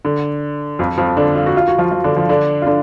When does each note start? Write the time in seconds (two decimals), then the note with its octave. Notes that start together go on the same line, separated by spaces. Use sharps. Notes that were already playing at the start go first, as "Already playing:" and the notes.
0.05 D3
0.79 F2 F3
0.98 F2 F3
1.17 D3 D4
1.35 F4
1.46 F#4
1.57 F4
1.68 F#4
1.78 F3 F4
1.92 F3 F4
2.04 D3 D4
2.17 F3 F4
2.29 D3 D4
2.62 F4
2.66 D3 D4